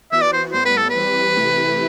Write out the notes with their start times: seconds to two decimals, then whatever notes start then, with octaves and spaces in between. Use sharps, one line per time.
0.12 E3 B3 F#4 E5
0.22 D5
0.33 C5
0.53 A2 G3 B3 C5
0.65 B4
0.77 A4
0.90 B4
0.95 E3 G3 C4 G4
1.37 C3 E3 A3 E4 G4